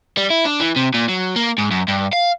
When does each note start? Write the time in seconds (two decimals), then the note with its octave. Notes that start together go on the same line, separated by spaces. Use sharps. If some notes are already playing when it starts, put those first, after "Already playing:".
0.17 G3
0.30 E4
0.45 D4
0.60 E3
0.76 C3
0.94 A#2
1.09 F#3
1.36 A#3
1.58 G#2
1.71 F#2
1.88 G2
2.13 F5